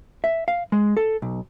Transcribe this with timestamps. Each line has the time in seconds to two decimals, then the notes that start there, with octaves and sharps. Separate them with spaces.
0.24 E5
0.48 F5
0.72 G#3
0.97 A4
1.22 B1